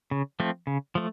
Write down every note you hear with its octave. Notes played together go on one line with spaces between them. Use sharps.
C#3
F3 A3 C4
C#3
F3 A3